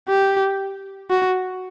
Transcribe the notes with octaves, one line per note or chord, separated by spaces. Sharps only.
G4
F#4